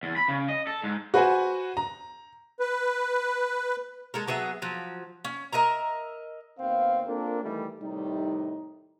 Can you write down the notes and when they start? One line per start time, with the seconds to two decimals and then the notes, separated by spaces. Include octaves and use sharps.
0.03 E2
0.16 B5
0.28 C#3
0.49 D#5
0.67 A4
0.83 G#2
1.14 F#4 B4 C5 F#5 G#5
1.77 A#5
2.60 B4
4.14 G#3 A4 A#4
4.28 F#3 B3 G#4 E5
4.62 F3 F#3
5.25 C#4
5.52 A#4 D#5 E5 A#5
6.59 D#2 B3 C4 F5
7.06 A#3 C4 D4 F4 A4 A#4
7.43 D#3 E3 G3 A3
7.81 A2 C3 D#3 G3 D#4